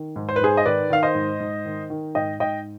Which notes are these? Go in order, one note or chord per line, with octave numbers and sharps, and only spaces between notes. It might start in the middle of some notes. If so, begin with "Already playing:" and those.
Already playing: D#3
G#2
C5
B4
G#2 G#4 C5
D#5
D#3 B4 D5
D#3 F5
C5 D#5
G#2
G#2
D#3
D#3
G#2 D#5 G5
G#2 D#5 G5